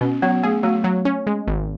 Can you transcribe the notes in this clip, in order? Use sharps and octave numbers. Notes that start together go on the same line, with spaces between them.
B2 C#4
F#3 B3
A3 G#4
F#3 A3
F#3
C#4
G#3
G#1